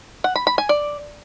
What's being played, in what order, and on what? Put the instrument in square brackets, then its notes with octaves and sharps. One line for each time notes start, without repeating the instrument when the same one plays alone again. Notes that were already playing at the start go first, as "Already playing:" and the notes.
[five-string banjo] F#5
B5
B5
G#5
D5